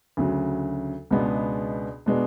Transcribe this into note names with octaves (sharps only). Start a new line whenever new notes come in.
D2 C#3 F#3
C#2 B2 G#3 B3 D4
B2 G#3 B3 D4